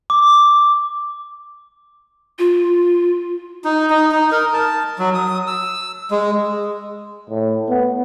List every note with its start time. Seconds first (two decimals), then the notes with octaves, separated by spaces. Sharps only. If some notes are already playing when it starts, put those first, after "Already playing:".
0.10 D6
2.39 F4
3.64 D#4
3.90 D#4
4.11 D#4
4.32 A#4
4.54 A5
4.99 F#3
5.14 D#6
5.47 E6
6.11 G#3
7.30 A2
7.69 B3